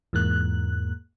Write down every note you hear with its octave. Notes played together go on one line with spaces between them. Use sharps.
E2 G#2 A#3 F#6